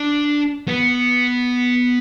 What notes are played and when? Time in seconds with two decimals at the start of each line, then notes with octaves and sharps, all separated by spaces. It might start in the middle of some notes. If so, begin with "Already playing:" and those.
Already playing: D4
0.68 B3